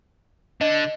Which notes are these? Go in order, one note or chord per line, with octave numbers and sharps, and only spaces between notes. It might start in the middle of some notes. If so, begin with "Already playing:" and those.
D3 D#5